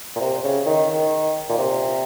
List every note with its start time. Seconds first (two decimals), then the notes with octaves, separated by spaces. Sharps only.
0.16 A#2
0.20 C3
0.43 C#3
0.66 D#3
0.89 D#3
1.49 A#2
1.58 C3